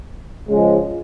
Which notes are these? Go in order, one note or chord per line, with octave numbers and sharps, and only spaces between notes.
C#3 F3 G#3